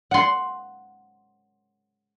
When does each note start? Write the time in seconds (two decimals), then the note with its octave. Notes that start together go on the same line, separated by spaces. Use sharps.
0.11 F#5 C6